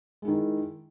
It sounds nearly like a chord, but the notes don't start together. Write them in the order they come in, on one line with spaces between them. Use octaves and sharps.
G#3 E4 D#3